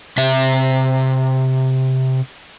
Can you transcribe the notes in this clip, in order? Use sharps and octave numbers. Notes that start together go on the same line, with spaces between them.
C3 E5